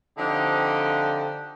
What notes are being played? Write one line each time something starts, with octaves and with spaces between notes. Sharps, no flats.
D3 F3 C4 D4 D#4 G4